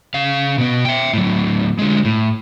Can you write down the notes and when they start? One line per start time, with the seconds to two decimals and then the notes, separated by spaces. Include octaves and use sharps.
0.14 C#3 F5
0.58 B2 B3
0.85 E5 G5
1.13 A2 F#3
1.79 D3 G#3
2.05 A2